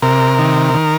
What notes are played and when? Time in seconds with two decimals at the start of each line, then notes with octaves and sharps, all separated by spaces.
0.02 C3 A#4
0.39 D#3
0.74 D#3